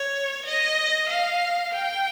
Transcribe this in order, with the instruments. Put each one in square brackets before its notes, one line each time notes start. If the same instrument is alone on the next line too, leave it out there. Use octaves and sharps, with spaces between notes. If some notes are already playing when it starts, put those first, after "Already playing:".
Already playing: [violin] C#5
D#5
F5
G5